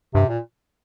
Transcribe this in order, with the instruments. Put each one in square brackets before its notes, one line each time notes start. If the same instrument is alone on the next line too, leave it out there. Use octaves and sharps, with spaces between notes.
[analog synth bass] G2 [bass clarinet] C3
[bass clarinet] A#2